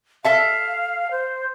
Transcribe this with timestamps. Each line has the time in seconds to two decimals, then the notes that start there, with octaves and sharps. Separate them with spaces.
0.24 A4 E5 F5 A5
1.11 C5